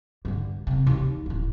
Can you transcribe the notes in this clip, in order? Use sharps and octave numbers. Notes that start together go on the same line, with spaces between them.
G2 D3
D#1 C3
D#2 D#3
D#1 A1